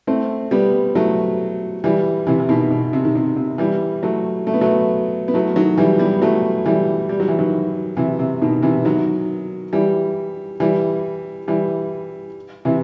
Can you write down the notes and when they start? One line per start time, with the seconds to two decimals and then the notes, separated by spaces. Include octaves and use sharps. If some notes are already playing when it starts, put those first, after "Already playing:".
0.07 A3 C4
0.51 G3 B3
0.95 F#3 A3
1.84 E3 G3
2.27 C3 E3
2.40 E3
2.49 B2 D#3
2.71 B2
2.93 C3
3.05 D#3
3.15 C3
3.36 C3
3.58 E3 G3
4.03 F#3 A3
4.47 A3
4.54 B3
4.61 F#3 A3
5.28 B3
5.34 F#3 A3
5.56 D#3 F#3
5.78 E3 G3
5.99 G3 B3
6.22 F#3 A3
6.66 E3 G3
7.09 G3
7.20 F#3
7.28 E3
7.39 D#3 F#3
7.97 C3 E3
8.19 C3
8.42 B2 D#3
8.62 C3 E3
8.85 D#3 F#3
9.73 E3 G3
10.60 E3 G3
11.48 E3 G3
12.65 C3 E3